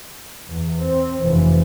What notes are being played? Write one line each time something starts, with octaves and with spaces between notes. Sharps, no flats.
E2
C4
F1 E3